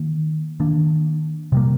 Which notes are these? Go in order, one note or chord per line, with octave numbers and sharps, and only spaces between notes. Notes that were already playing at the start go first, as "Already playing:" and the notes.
Already playing: D#3 A#3
D#3 A#3 D4
C3 G3 A#3